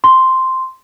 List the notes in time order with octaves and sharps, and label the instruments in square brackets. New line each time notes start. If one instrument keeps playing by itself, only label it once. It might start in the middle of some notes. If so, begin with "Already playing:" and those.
[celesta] C6